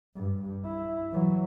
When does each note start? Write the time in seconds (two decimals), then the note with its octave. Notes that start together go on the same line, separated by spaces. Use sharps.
0.15 G2
0.64 E4
1.12 E3 F#3